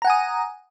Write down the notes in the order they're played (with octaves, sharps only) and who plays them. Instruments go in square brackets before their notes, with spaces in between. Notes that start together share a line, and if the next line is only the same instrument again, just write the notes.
[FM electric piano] A#5
F#5
G#5
D#6